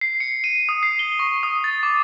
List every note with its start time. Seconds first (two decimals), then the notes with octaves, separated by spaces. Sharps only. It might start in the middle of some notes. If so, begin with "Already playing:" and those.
0.01 C7
0.20 C#7
0.44 D#7
0.69 D#6
0.83 C7
0.99 G7
1.19 C#6
1.43 D#6
1.64 A6
1.83 D6